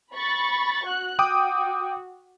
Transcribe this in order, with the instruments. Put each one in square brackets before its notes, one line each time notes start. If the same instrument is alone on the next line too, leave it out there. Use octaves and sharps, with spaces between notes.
[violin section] B5 C#6 A6
F#4 F#6
[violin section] F#4 [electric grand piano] G5 D6 D#6